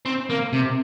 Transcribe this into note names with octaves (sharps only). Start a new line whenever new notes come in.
C4
A#3
C3